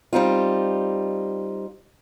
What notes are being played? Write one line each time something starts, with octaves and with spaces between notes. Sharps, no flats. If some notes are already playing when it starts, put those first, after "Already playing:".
G3 C4 D#4 F4